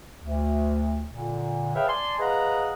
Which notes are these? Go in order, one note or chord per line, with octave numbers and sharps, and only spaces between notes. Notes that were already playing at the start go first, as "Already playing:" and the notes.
D2
A#2 D3
G#4 B4 C#5 E5 F5 G5
D5 G#5 A5 C6
G#4 B4 D#5 F5 F#5 A#5